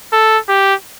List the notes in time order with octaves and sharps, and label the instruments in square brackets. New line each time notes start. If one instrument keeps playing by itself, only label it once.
[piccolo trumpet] A4
G4